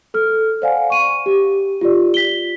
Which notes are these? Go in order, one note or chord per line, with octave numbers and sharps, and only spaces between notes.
A4 F6
C5 D5 F5 F#5 G#5
C#6 D#7
G4
F4 G4 D5
B6 G7